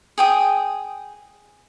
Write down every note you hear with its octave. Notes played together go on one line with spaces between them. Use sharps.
G#4 G5 D#6